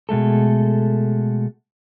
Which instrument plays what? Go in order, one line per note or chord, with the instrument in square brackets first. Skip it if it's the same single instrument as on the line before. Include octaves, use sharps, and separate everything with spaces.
[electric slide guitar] B2 G#3 A3 A4